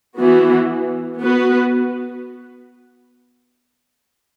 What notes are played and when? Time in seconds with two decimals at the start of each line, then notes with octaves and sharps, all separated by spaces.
0.19 E3 B3 F#4
1.21 B3 F#4 B4